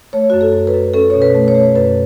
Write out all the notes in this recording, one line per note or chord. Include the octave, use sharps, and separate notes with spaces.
A3 C#5
F#2 F#4
A4
F#2
B4
F#2
C#4 A4
B2 C#5
B4
A3
C#5
A3
F#2 B4